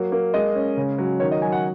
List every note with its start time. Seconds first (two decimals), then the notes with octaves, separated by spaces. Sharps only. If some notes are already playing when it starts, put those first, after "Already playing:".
Already playing: F#3 A#3
0.12 A#3
0.34 G#3 D#5
0.55 C#4
0.77 C#3
0.98 F#3
1.20 D#3 C#5
1.32 D#5
1.42 F#3 G#5
1.52 F#5